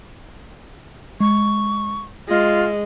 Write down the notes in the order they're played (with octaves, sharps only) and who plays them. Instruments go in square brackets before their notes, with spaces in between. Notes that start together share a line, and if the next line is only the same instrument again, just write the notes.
[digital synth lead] G#3 [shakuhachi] C#6
[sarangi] G#3 [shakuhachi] F4 [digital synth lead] A#6